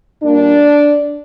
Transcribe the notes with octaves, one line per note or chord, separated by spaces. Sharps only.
A#2 G3 A#3 D4